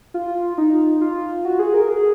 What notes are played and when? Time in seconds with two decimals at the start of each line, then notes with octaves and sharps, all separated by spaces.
0.14 F4
0.58 D#4
1.01 F4
1.45 F#4
1.59 G#4
1.74 A#4
1.89 G#4